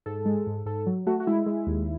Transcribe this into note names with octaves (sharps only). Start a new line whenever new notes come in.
G#2 A4
G#3
G#2
G#2 A4
F#3
A3 F#4
F#4
G#3 E4
G#3
D#2